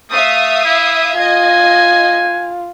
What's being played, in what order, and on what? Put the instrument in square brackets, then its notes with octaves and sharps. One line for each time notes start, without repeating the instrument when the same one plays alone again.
[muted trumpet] A3 [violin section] E5 F5 D#6
[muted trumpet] E4
[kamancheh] F4 [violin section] D#5 G#6 [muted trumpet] G#5